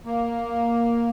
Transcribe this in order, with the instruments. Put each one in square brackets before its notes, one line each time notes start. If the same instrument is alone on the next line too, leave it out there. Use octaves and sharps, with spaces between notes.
[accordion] A#3